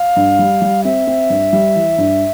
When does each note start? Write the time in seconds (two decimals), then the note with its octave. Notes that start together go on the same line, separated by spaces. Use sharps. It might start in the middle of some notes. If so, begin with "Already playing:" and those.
Already playing: F5
0.16 G2
0.39 G3
0.62 G3
0.84 C4 E5
1.07 C4
1.30 G2
1.53 G3
1.75 E3
1.98 G2